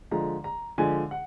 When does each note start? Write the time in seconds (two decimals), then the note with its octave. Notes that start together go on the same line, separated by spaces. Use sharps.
0.11 D3 F3 G#3 A#5
0.44 A#5
0.78 D3 F3 G#3 G#5
1.11 F#5